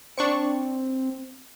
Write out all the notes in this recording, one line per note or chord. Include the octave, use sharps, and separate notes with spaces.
C4 D4 C#6 C#7